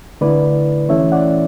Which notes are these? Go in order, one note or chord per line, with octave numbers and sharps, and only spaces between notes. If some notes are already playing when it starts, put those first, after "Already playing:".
D3 A3 E4 B4 D5
E3 A3 C#4 E4 C#5 E5
D5 F#5